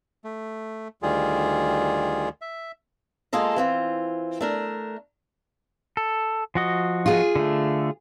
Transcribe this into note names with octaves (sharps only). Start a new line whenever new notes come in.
A3
D2 D#3 G3 F4 G#4
E5
G#3 A#3 F4 G#4 A4 D#5
E3 C4 F4
A3 D4 A#4
A4
F3 F#4 D#5
F4 G#4
D3 A3